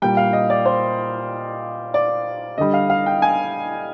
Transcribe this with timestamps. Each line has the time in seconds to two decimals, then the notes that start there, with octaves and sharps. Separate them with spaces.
0.02 A#2 G3 G5
0.17 F5
0.33 D#5
0.50 D5
0.66 C5
1.94 D5
2.58 D3 G3 D#5
2.74 F5
2.90 F5
3.06 G5
3.22 G#5